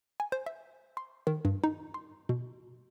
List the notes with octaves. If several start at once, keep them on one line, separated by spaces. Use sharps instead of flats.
G#5
C5
E5
C6
D#3
G2
D#4
C6
B2